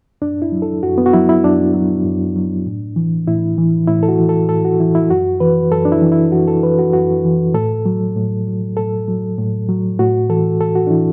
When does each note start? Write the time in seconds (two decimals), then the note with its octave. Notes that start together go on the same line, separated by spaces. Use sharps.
0.22 F#2 D4
0.42 E4
0.52 F#3
0.62 A4
0.83 F#2 F#4
0.98 B3
1.06 F#4
1.13 F#3 E4
1.29 E4
1.44 F#2 D4
1.74 F#3
2.05 F#2
2.36 F#3
2.66 A2
2.96 E3
3.27 A2 E4
3.58 E3
3.88 A2 E4
4.03 A4
4.09 F#4
4.19 E3
4.29 A4
4.49 A2 A4
4.65 F#4
4.80 E3 E4
4.95 E4
5.10 F#2 F#4
5.40 E3 B4
5.71 F#2 A4
5.85 D4
5.92 E4
6.02 E3
6.12 E4
6.32 F#2 F#4
6.47 A4
6.63 E3 B4
6.79 F#4
6.93 F#2 F#4
7.25 E3
7.54 A2 A4
7.86 F#3
8.16 A2
8.47 F#3
8.77 A2 A4
9.08 F#3
9.38 A2
9.69 F#3
9.99 A2 F#4
10.29 E3 A4
10.61 A2 A4
10.75 F#4
10.87 D4
10.91 E3 E4